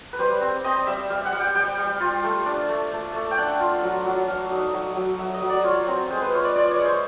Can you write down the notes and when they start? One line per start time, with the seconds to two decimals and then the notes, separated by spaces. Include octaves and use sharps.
0.13 B4
0.19 G3 C5
0.41 C4
0.64 C4 D#5
0.87 G3 E5
1.10 G3 F5
1.25 F#5
1.32 G3
1.40 G5
1.55 G3 G5
1.78 G3
2.00 F4
2.23 A3
2.46 D4
2.69 A3
2.92 A3
3.14 A3
3.31 G5
3.38 D4 F#5
3.60 F4
3.83 F#3
4.05 F#3
4.28 F#3 F5
4.51 D#4
4.74 F#3
4.96 F#3
5.19 F#3 E5
5.34 D#5
5.42 F#3
5.50 D5
5.64 F4 C#5
5.87 C4
6.10 G#3 C5
6.22 B4
6.33 F4 C#5
6.44 D5
6.55 F4 D5
6.71 C#5
6.78 G#3
6.85 C5